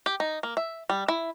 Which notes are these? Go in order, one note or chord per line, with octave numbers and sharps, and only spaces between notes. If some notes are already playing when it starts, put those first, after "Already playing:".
G4
D#4
A#3
E5
G3
E4